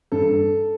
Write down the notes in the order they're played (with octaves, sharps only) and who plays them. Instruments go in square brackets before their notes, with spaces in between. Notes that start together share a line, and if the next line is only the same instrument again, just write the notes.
[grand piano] G2 A4